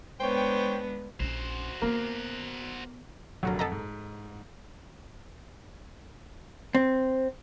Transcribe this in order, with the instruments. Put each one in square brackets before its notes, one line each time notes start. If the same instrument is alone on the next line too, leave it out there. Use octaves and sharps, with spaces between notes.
[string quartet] G#3 B3 D4 [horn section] C5 C#5 G5
[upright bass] A#1 C#4 [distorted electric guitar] F#4 C5
[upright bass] D#3 B3 [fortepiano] A#3
[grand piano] F1 D3 [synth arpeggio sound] F#3 F#4 A#4
[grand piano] F2 F#5 B6 [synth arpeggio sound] A4 D#5 A#5
[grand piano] G#2
[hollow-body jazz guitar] C4